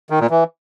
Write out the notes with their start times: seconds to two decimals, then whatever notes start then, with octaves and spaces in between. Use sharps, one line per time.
0.10 D#3
0.20 A#2
0.30 E3